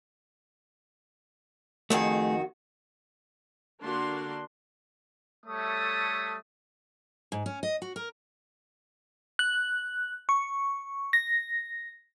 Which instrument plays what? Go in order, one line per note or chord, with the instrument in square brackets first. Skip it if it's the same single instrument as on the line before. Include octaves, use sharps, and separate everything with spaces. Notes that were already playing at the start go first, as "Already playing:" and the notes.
[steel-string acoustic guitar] F2 D#3 F#4 [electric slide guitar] A3 G#4
[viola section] D3 A#3 D4 F#4 C6
[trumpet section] G3 A3 A4 C#5 E5 D#6
[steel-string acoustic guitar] G#2
C#4
D#5
F#4
A#4
[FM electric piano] F#6
C#6
A#6